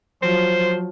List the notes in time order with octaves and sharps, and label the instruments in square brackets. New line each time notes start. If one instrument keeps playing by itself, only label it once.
[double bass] F3 F#3 [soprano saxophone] C5